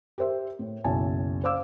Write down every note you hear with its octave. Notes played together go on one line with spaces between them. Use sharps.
G4 A#4 C5 E5
A2
F#1 B1 E4 G#5 A5
C5 F5 D6 E6